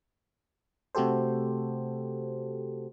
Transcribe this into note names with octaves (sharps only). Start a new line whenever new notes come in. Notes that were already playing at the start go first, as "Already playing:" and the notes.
C3 A3 F#4 G4 A4 C5